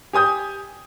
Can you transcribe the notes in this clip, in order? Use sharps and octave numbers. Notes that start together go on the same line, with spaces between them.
G4 G#5 D#6 G6